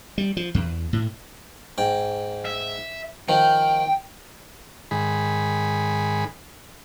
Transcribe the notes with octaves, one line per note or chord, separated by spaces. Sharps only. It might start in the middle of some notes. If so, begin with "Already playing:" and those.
G3
F3
E2
A2
G#2 G5
E5
D#3 F3 G5
G#2 D#3 G#4 B5